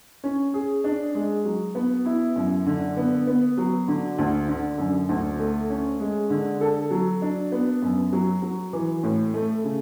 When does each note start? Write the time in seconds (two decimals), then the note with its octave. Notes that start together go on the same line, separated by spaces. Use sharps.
0.24 C#4
0.54 G#4
0.84 D4
1.15 G#3
1.45 F#3
1.75 B3
2.06 E4
2.36 F#2
2.66 D3
2.97 B3
3.27 B3
3.57 F#3
3.88 D3
4.18 D2
4.48 D3
4.78 F#2
5.09 D2
5.40 A3
5.70 C#4
6.00 G#3
6.30 D3
6.61 A4
6.91 F#3
7.22 D4
7.52 B3
7.82 F#2
8.12 F#3
8.42 F#3
8.73 E3
9.03 A2
9.34 A3
9.64 C#3